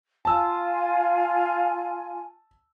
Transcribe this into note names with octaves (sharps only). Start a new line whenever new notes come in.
F4 G#5 A5 E6